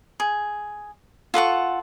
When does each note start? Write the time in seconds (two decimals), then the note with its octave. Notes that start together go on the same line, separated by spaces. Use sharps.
0.20 G#4
1.34 F4 A4 F#5 C#6